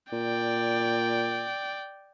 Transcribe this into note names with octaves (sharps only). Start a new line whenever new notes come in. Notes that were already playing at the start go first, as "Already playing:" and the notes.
A#2 D5 G5